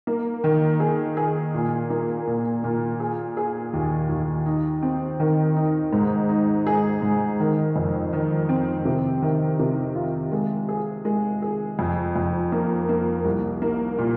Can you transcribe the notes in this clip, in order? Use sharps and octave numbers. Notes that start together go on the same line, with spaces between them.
A#3
D#3
G#4
G#4
A#2
A#3
A#2
A#2
G#4
G#4
D#2
D#2
D#4
C4
D#3
D#4
G#2
D#4
G#4
G#2
D#3
F2
D#3
C4
C3
D#3
C3
F4
G#3
G#4
G#3
G#4
F2
F2
A#3
A#3
C2
A#3
A#2